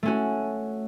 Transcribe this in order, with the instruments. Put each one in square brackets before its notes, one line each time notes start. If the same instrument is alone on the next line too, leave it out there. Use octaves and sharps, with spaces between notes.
[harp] A3 C#4 F#4